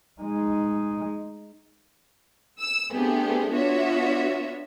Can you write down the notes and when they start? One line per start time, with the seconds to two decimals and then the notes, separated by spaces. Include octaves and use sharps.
0.22 G#3 D#4
2.60 E6
2.93 A3 B3 C4 D4 G4 G#4
3.51 B3 D4 F4 F#4 C#5 E5